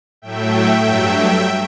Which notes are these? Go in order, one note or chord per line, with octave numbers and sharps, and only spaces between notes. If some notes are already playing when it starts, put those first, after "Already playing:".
A2 F#3 A3 E5 G5
G2 F#3 A3